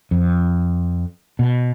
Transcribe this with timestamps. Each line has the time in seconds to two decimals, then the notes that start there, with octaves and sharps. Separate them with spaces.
0.11 F2
1.39 B2